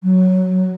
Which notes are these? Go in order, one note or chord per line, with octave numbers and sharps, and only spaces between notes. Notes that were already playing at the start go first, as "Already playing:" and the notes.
F#3